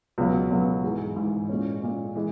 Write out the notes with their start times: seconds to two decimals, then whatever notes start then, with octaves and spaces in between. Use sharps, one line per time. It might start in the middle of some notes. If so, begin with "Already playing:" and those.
0.18 C#2 B2 F#3
0.50 C#2 B2 F#3
0.84 G#2 E3 G#3
1.16 G#2 E3 G#3
1.49 A#2 G#3 C#4
1.82 A#2 G#3 C#4
2.15 E3 G#3